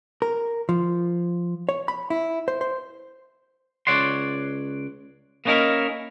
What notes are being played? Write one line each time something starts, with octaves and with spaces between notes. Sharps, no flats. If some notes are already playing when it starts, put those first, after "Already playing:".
A#4
F3
C#5
B5
E4
C5
C5
C#2 C#5 D5 F#5 C6
A#3 B3 C#4 D#4 E4 A#4